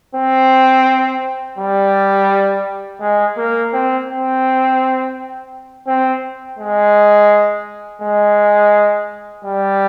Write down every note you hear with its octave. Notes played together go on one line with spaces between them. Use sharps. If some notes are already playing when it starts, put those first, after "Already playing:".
C4
G3
G#3
A#3
C4
C4
C4
G#3
G#3
G3